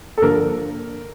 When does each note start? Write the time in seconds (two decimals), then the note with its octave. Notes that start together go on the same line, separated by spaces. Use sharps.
0.18 A4
0.22 G2 D3 F3 A#3 D4 A#4